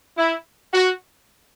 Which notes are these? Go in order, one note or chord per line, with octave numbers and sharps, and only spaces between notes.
E4
F#4